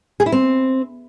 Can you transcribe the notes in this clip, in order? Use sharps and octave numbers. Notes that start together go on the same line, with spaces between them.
G#4
E4
C4